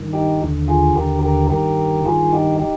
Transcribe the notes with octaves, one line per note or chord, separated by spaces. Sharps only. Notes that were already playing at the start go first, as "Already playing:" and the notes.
Already playing: G2 D#3
D#4 G4
D#2 D3
F4 G#4
D#2 D3 G4 A#4
G4 A#4
G2 D#3 G4 A#4
G2 D#3 F4 G#4
D#4 G4
D#4 G4